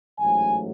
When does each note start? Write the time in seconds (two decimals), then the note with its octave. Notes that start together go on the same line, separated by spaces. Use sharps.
0.18 A1 G#2 F#3 A3 G#5